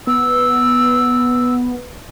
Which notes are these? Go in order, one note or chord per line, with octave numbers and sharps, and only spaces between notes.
B3 E6